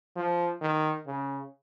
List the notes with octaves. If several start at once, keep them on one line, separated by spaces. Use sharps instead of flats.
F3
D#3
C#3